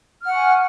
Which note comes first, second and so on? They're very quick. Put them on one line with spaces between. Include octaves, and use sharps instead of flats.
F6 F#5 C#6 G#5